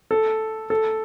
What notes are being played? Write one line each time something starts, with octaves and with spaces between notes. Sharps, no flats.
A4
A4